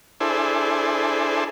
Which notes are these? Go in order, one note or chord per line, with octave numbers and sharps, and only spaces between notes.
D4 E4 G#4 A4 C5